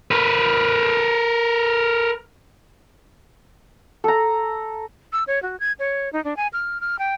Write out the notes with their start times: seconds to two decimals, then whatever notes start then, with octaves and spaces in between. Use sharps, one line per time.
0.11 A#4 B4
4.04 A4 A#5
5.13 E6
5.27 C#5
5.43 F#4
5.60 G#6
5.79 C#5
6.13 D#4
6.24 D4
6.37 G#5
6.53 F6
6.81 F6
6.99 G5